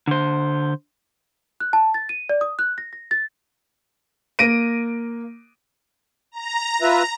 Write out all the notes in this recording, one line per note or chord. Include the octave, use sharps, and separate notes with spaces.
D3 C5
F#6
A5
A6
D#7
D5
D#6
F#6
A#6
A#6
A6
A#3 A#6 D7 D#7
A#5
F4 B4 E5 A#5